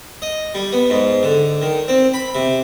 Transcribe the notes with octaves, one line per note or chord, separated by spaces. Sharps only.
D#5
G3
B3
G#2
D3
D#3
C4
B5
C3